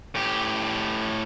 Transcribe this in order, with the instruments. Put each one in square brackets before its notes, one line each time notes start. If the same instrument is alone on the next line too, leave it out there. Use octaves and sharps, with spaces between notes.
[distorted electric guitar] A2 G4